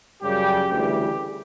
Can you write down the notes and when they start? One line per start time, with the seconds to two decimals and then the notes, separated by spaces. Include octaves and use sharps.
0.22 F#2 C#3 G3 G4
0.71 D2 C#3 E3 G3 G4